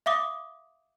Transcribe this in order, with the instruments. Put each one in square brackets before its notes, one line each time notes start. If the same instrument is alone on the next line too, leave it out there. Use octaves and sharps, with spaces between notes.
[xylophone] E5 F5 D6 D#6